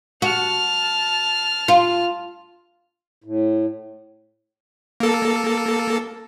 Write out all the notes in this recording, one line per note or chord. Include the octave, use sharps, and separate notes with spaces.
F#4 A5 F6
F4
A2
A#3 A4